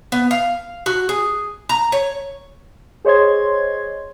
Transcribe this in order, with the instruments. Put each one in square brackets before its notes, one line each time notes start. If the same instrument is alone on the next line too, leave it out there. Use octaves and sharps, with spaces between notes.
[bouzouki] B3
F5
F#4
G#4
A#5
C#5
[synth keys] G#4 C5 C#5 D#5 C6 G#6